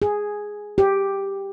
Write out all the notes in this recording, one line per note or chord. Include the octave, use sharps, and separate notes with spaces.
G#4
G4